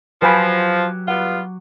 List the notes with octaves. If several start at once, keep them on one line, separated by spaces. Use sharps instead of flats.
F3 F#3 G4 B4 G#5 B5
G3 B3 F4 F#5